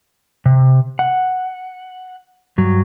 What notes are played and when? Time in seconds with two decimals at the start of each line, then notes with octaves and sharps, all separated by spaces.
0.46 C3
0.99 F#5
2.58 G2 F#3